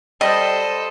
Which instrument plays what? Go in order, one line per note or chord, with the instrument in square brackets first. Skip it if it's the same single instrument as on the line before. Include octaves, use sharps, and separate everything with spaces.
[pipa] G3 [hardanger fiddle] A4 C5 [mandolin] D#5